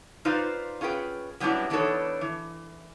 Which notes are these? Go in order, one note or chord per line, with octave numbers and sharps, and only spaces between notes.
D#4 F4 B4 C5 D5 F5
C#4 F4 G#4 B4 G5
F#3 G3 B3 C#4 D4 E4
E3 B3 D4 D#4 A4 C#5
E3